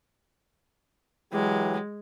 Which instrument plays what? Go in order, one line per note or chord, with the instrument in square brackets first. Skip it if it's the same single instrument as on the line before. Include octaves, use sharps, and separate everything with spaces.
[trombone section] E3 F#3 G4 [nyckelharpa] G#3